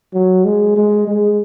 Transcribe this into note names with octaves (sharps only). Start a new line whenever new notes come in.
F#3
G#3
G#3
G#3